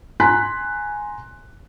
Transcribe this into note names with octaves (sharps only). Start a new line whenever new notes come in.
G#5 A#5 C6 F#6 B6